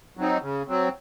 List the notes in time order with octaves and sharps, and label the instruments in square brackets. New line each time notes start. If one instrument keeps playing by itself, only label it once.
[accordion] F#3 C4 D#4
C#3
F#3 C4